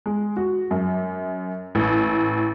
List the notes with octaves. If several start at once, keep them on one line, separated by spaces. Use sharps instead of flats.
G#3
F#4
F#2
A1